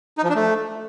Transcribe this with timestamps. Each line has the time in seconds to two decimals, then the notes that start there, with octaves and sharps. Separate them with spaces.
0.18 D#4
0.24 F3
0.29 D4
0.35 A3